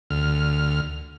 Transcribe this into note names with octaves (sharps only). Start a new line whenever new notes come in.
D2 F6